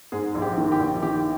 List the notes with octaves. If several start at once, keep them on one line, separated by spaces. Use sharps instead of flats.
G#2 G#4
A#1
G4
D#3
G4
A#1
D#3 G4